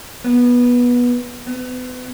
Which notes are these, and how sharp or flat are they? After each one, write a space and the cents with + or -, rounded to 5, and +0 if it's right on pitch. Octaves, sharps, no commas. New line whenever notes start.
B3 -15
B3 +35